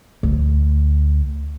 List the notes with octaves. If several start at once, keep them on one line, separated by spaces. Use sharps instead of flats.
D2